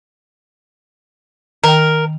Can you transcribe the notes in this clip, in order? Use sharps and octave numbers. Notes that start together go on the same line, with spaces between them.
D#3 A#4 G5